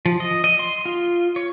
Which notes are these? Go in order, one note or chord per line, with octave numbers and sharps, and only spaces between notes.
F3
D#5
D#5
C6
F4
C#5